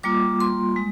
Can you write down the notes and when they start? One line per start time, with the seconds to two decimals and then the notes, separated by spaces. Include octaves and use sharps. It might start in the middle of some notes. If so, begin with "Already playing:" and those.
0.03 G3 A#3 F4 D6
0.40 C6
0.76 G#3